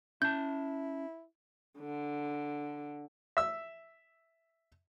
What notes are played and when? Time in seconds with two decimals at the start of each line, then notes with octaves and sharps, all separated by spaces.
0.22 C#4 E4 A5 G6
1.79 D3
3.37 E5 E6